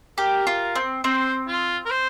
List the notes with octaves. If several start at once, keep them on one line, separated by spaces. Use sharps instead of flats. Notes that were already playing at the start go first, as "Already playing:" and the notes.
G4 A#4
F4
C4
C4 C5
F4
A#4
C5